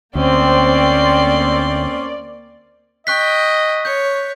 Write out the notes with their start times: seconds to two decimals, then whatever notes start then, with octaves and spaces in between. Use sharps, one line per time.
0.15 D2 A#3 C4 C#4 D5 C6
3.07 D#5 G5 C#6 F#6 B6
3.85 C#5 G6